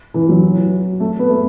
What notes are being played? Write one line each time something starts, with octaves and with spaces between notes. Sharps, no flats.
E3
F#3
A3
B3
A3